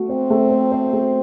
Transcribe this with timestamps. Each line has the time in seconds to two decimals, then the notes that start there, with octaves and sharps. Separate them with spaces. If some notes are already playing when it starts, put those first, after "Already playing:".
Already playing: A3 F#4
0.09 C4 C5
0.30 A3
0.51 C5
0.72 C5
0.93 A3